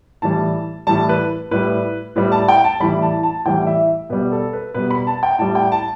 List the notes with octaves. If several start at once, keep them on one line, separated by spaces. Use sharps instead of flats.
A2 E3 G3 A5
A2 E3 G3 A5
B4
A2 G3 B4
A2 G3 B4
A5
G5
A5
A2 E3 G3 B5
A5
A5
A2 E3 G3 G5
E5
B2 G3 B4
A4
B4
B2 G3 B4
B5
A5
G5
A2 G3 A5
G5
A5